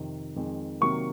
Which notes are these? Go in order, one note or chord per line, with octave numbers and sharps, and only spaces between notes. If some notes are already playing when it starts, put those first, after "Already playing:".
Already playing: F2 C3 D#3
F2 D#3 G#3
C3 D#3 F#3 A#3 C#6